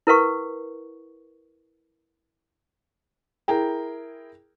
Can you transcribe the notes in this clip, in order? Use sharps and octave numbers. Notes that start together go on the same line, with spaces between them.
E4 A#4 B4 F#5 C#6
E4 G#4 A#4 G5 A#5